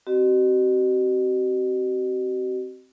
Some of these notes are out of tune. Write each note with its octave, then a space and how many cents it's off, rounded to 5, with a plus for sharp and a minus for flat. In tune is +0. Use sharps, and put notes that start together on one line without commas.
C4 +0 F#4 +45 D#5 -40